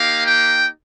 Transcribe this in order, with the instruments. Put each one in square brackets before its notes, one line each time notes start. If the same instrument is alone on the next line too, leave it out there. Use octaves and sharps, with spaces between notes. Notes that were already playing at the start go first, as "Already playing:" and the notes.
Already playing: [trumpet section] A#3 D#4 G4 F5
G5